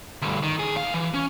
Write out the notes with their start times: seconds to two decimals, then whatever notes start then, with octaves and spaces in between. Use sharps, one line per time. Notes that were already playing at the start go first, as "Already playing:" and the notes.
0.22 D2 G2
0.43 D#3
0.59 C#2 G#4
0.77 C2 F5
0.94 E3
1.14 C#4